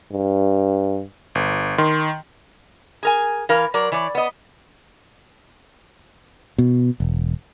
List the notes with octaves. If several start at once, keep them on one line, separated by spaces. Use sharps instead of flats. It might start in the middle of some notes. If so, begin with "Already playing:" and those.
G2
G1
D#3 C6
G#4 A#4 G#5
E3 A#4 F5
F#3 A#4 D5
E3 C#5 D5
B3 D#5
B2
E1